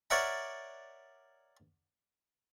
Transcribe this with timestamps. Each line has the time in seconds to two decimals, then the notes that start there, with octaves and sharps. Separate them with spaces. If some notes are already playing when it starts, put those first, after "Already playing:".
0.10 A#4 C#5 D5 E5 F#5 A#5